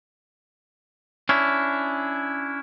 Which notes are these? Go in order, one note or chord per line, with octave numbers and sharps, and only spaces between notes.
C#4 D4 E4